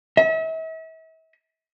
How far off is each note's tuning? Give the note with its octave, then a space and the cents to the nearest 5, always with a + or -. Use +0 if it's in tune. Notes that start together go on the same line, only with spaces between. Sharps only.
E5 -40